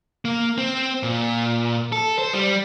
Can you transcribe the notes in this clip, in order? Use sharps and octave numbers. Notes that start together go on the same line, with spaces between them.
A#3
C4
A#2
A4
C5
G3